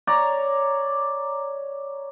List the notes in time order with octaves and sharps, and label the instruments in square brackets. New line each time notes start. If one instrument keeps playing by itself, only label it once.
[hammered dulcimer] C#5 D5 A#5